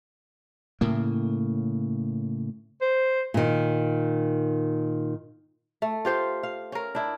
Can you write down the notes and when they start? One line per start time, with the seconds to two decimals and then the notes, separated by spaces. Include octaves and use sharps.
0.81 A2 C#3 A#3
2.82 C5
3.34 A#2 D#3
5.82 A3
6.05 F4 G4 C5
6.43 F5
6.72 C#4 A#4
6.95 D4 E4